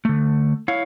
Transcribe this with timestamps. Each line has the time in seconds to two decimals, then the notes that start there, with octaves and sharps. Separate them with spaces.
0.05 D3 A3
0.68 E4 C#5 F5